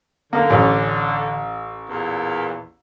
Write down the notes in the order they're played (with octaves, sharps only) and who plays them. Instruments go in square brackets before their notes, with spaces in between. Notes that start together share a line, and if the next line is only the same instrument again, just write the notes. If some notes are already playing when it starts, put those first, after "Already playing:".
[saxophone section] D3 [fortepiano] A#3
[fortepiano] A1 C#4
[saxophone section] E2 A#2